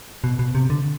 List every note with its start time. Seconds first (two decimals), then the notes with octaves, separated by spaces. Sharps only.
0.24 B2
0.39 B2
0.55 C3
0.70 D3